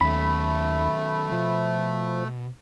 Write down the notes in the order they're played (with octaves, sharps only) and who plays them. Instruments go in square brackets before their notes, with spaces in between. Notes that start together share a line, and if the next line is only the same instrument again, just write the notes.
[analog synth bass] D#2 [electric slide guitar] D#3 F#3 C#4 [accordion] A3 [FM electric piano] B5
[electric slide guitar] B2 [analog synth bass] F3